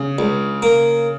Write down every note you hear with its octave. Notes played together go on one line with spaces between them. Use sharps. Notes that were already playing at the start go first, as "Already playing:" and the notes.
Already playing: C#3
C#2
A#3